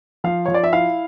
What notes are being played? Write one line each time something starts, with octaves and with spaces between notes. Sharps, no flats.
F3 F5
F3 C#5
D5
E5
E4 F5